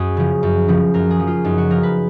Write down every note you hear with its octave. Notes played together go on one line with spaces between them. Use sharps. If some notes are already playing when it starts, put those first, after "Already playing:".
Already playing: F#2 F#4 G#4
C#3 F3
F#2
C#3 F3
F#2 A#4
G#4
F3
F4
F#2 D#4
F#4
F3 A#4
B4